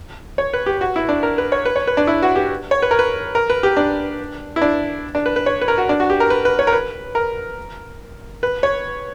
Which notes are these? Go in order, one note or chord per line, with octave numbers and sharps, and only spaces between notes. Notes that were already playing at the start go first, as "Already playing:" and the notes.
C#5
B4
G4
F#4
E4
D4
A#4
B4
C#5
B4
C#5
B4
D4
E4
F#4
G4
C#5
B4
A#4
B4
A#4
B4
G4
D4
E4
D4
D4
B4
B4
C#5
B4
A#4
F#4
D4
F#4
G4
A#4
B4
B4
C#5
A#4
B4
A#4
B4
C#5